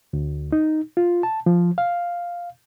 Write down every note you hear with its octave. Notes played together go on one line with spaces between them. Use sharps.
D2
D#4
F4
A5
F3
F5